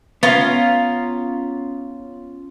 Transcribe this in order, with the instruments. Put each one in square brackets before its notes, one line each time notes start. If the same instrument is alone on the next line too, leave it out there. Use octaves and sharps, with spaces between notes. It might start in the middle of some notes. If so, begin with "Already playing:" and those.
[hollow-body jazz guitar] B3 [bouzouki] C#4 F4 A#5